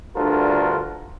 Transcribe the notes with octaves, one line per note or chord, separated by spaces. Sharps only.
D2 G2 D3 F4 A4 A#4